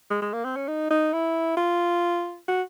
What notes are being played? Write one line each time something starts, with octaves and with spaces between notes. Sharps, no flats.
G#3
G#3
A#3
C4
C#4
D#4
D#4
E4
F4
F#4